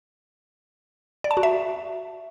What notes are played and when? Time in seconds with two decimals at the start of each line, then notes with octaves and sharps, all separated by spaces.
1.24 D5
1.31 A5
1.37 F#4
1.43 E5